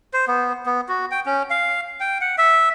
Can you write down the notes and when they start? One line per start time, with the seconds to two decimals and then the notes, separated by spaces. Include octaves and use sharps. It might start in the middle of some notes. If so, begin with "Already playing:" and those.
0.13 C5
0.28 B3
0.66 B3
0.89 F#4
1.11 G5
1.26 C#4
1.50 F5
2.00 G5
2.21 F#5
2.38 E5